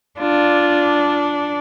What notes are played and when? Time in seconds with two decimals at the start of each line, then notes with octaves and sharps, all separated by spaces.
0.19 D4 F4